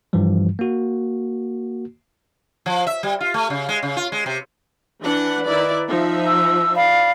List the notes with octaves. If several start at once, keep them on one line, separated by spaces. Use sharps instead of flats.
G2 E3 F3 G3
A#3 F#4
F3
E5
G3
F4
A3
C#3
G#3
C#3
F4
G#3
C3
E3 D4 B4 F#5
D#3 E4 D5
F3 D#4 E5
E6
D5 F5 B5